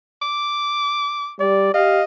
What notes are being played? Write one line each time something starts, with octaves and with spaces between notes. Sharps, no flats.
D6
G3 D5
G4 D#5 F5